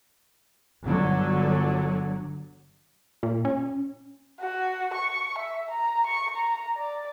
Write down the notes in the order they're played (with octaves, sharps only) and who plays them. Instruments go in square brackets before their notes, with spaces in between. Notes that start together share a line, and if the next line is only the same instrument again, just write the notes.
[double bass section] G1 D3 F#3
[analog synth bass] A#2
C#4
[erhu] F#4
C#6
E5
A#5
C#6
A#5
D5